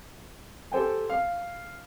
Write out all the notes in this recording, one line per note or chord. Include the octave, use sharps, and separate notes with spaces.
G4 A4 C5 G5 G#5
F5